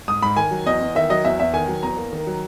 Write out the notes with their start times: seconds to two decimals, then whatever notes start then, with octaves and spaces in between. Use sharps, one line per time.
0.08 G#2 D#6
0.22 G#2 B5
0.36 D#3 G#5
0.51 F#3
0.66 E2 D#5
0.81 E2
0.95 D#3 E5
1.10 F#3 D#5
1.24 E2 E5
1.39 E2 E5
1.53 D#3 G#5
1.68 F#3
1.83 E2 A#5
1.97 A#3
2.13 D#3
2.27 F#3